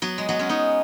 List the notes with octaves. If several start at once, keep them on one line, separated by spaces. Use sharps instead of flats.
F#3 B3
G#3
F#3 B3
G#3 C#4
B3 D#4